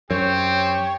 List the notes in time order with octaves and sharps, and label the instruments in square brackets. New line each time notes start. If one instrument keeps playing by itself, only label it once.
[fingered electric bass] F#2 [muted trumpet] C4 [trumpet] G4 [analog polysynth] C#5